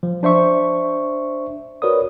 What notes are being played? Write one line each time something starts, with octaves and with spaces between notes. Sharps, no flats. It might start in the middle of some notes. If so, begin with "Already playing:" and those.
F3
D4 C5 E5 C#6
F#4 A#4 B4 C#5 D5 D#6